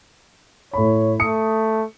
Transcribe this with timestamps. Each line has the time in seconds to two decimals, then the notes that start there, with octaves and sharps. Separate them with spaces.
0.73 A2 C#5 B5
1.20 A3 D#6 C#7